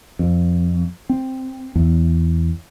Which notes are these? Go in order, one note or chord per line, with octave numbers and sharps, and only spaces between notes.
F2
C4
E2